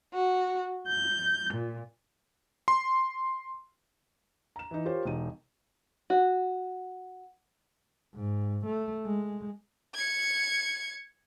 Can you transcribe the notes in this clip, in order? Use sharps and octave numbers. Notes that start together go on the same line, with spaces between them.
F#4
G6
A#2
C6
A#5 E7
E3 D#4
F4 G4 A#4 C5 C#5
E1 D#4 D#7
F#4
G#2
A3
G#3
G#6 C#7